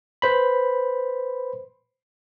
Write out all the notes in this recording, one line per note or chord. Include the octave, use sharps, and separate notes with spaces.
B4 C5 B5